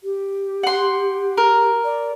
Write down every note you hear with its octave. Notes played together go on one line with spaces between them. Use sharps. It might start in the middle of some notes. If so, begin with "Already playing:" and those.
G4
F#5 C6
A#4
D5